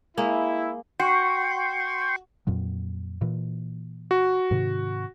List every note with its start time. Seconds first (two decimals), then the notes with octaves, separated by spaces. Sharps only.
0.17 G#3 A#3 E4
1.00 F#4 G5 C6 C#6
2.47 F2 A#2 F#3
3.21 A#2 E3
4.11 F#4
4.51 G#2 C3 D#3